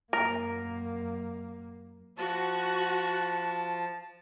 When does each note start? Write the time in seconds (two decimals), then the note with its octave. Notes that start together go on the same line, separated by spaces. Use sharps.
0.13 F#2 A#3 A#4
2.18 F3 F#4 A5